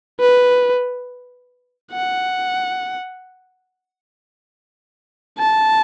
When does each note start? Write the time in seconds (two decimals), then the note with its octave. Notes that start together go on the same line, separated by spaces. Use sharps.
0.20 B4
1.92 F#5
5.38 A5